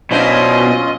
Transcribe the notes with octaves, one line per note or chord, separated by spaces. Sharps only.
B2 F#3 C#4 D4 E4 F4 C5 D#5